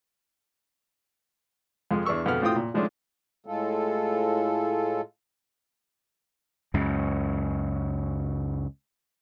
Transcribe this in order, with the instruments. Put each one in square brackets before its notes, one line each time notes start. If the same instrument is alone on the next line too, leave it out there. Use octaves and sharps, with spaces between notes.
[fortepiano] F2 F3 G#3
E2 D4 B4 C#6 E6
F2 B2 D3 B4 F#5 F6
A2 C4 F4 F#4 G5 D#6
A#2
D#3 F3 G#3 A3 C#4 D4
[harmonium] A2 G#3 F4 A4
[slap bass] C#2 F#2 C#3